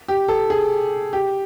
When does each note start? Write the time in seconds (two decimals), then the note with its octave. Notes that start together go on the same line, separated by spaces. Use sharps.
0.08 G4
0.28 A4
0.50 G#4
1.13 G4